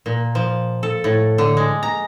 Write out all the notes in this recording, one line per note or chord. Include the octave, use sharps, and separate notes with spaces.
A#2
F3
A4
A2
D3
G#3
A#5